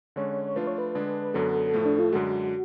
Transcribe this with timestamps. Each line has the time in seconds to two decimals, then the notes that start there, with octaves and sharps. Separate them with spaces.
0.16 D3 G#3 C#4 C#5
0.56 F3 A3 D4 F4 B4
0.67 C#5
0.78 B4
0.95 D3 G#3 D4 G#4
1.34 F#2 D3 F#3 B3 A4
1.74 A2 F3 A3
1.85 D4
1.99 F4
2.12 F#2 D3 G#3 F#4